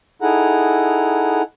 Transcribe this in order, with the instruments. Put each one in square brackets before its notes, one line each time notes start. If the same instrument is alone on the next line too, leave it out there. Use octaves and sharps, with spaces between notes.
[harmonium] D#4 E4 G#4 A4 F#5 A#5